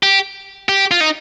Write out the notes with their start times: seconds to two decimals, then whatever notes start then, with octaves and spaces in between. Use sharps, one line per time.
0.03 G4
0.69 G4
0.91 F4
1.01 D#4